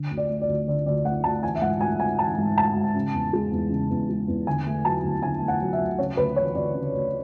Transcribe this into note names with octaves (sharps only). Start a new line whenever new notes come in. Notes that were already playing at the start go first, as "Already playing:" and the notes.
Already playing: D3
D2
D5
A3
D5
D2
D3 D5
D2 D5
A3 F#5
D2 A5
E3 G#5
E5
G#2 F#5
A3 G#5
G#2 G#5
E3 A5
G#2
A3 A5
G#2
C#3
E2
G#3
E2
C#3
E2
G#3
E2
D3 G#5
A3
F#3 A5
D2
D3 G#5
A3
F#5
F#3
E5
D2
C#3 C#5
D2 B4
E3 C#5
D2 D5
C#3
D2